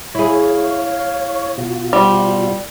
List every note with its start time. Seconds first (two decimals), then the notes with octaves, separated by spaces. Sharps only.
0.15 E4 G#4 C#5 F5
1.58 B2 F4 F#4
1.93 G3 C5